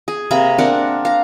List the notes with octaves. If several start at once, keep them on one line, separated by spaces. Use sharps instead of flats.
G#4
C3 A#3 A#5 B5
C4 D4 A#4 F#5
F5 A#5